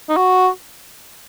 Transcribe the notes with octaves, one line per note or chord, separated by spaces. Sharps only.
D#4
F#4